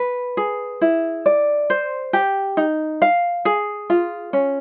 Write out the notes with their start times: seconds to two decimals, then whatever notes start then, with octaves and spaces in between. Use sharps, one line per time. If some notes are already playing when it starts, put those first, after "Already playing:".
Already playing: B4
0.37 G#4
0.81 E4
1.26 D5
1.70 C5
2.13 G4
2.57 D#4
3.02 F5
3.45 G#4
3.90 F4
4.33 C#4